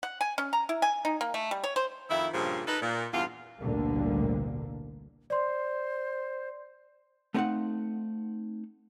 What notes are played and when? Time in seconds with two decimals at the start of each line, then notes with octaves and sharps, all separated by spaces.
0.03 F#5
0.21 G#5
0.38 C#4
0.53 A#5
0.69 E4
0.82 G#5
1.05 D#4
1.21 A#3
1.34 A3
1.51 G3
1.64 C#5
1.76 C5
2.10 F2 D#3 E4
2.33 G2 A#2 C#3 F3
2.67 D#4 A4 B4
2.82 A#2
3.13 E2 G2 F4
3.60 A1 D2 B2 D3 G3 A#3
5.30 C5 D5 C6
7.34 A3 B3 C4 D#4 F5 F#5